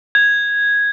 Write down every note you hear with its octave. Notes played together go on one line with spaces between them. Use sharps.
G#6